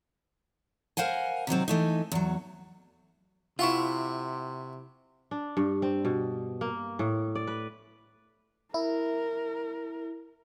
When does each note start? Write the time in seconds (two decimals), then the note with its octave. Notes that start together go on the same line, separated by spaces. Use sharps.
0.97 A#4 C5 F5 F#5 G#5
1.47 C3 D#3 F#3 C4
1.68 E3 A3 D#4
2.12 E2 F#3
3.59 C3 E4 F4 E5 F#5 C#6
5.31 D4
5.57 G2
5.82 C4
6.05 B2
6.61 A#3
6.99 A2
7.35 D5
7.47 B4
8.74 E4 A#4